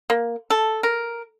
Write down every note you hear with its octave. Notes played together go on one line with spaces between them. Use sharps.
A#3
A4
A#4